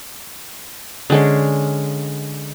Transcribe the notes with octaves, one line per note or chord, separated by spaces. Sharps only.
D3 G#3 C#4